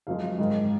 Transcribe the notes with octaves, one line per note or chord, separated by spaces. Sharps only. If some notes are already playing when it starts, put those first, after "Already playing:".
F#2 F3 G#3 F5
G#2 D#3 G#3